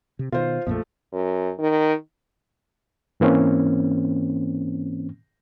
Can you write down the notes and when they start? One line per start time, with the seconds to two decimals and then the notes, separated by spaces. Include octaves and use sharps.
0.19 C3
0.32 B2 D#3 F4 C5
0.66 A#1 F2 A#2 F3 A3
1.12 F#2
1.58 D#3
3.20 G#2 E3 A#3 C4 C#4